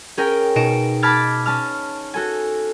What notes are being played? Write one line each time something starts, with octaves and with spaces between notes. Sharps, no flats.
C#4 G#4 A#4 G5
B2 D#4 D#5 D7 E7
A5 B5 D6 F6 G#6 A6
C#4 A5 F6
F#4 A4 G#5